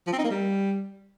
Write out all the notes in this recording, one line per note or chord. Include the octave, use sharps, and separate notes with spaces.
F3
C4
D#4
A#3
G3